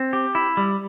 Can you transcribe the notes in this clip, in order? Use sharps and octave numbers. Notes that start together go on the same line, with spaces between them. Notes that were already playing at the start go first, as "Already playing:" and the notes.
Already playing: C4
G4
E4
G3